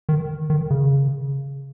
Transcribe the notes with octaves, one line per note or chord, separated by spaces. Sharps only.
D#3
D#3
C#3